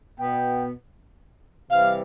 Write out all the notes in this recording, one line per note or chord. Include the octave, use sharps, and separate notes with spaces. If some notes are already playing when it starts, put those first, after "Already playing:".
B2 B3 G5
C3 E3 G3 F5